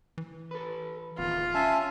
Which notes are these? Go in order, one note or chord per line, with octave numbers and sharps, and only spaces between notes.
E3
A4 B4
D1 E2 G#2 D#3 F4
C#4 E5 G#5 A5